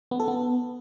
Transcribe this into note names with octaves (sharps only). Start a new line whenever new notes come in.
B3
A4
B3